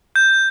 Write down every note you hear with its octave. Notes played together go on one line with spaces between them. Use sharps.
G6